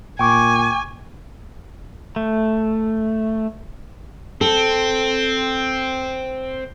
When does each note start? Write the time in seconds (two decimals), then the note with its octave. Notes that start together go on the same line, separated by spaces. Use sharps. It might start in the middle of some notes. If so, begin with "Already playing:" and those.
0.19 A#2 G5 G#5 C#6 D6
2.16 A3
4.41 C4 A4